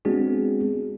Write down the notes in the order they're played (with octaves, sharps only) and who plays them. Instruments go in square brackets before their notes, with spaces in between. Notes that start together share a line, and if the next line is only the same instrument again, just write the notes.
[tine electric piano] G#3 B3 C4 D4 F#4 G#4